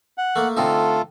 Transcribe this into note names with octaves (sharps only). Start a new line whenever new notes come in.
F#5
A3 A#3
D3 A3 C4 D#4 F4 A4